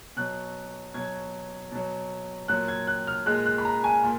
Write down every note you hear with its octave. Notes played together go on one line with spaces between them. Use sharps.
B2 F#3 F#6
B2 F#3 G#6
B2 F#3
A#2 F#3 F#6
G#6
F#6
F6
A#2 G#3 F#6
F#6
B5
A#5
G#5
A#2